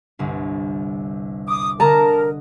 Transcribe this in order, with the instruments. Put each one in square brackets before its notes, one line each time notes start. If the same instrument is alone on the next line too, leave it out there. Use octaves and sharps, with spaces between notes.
[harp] G1 C2
[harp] D6 [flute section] D#6
[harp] D3 D#5 [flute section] A#4 [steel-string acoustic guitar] A5 A#5